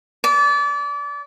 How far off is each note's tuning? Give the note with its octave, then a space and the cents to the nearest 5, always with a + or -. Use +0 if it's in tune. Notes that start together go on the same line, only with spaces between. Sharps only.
D5 -30